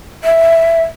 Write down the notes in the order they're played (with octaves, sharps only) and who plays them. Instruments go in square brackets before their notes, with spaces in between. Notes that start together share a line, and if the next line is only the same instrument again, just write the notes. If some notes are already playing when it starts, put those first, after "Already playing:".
[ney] E5